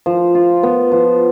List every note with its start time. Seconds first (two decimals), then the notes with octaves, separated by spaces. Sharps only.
0.06 F3
0.35 F4
0.63 B3
0.92 F3